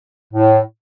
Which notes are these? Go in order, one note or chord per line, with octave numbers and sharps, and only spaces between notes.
A2